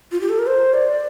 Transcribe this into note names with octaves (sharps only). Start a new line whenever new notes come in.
F4
G4
A4
A#4
C5
D5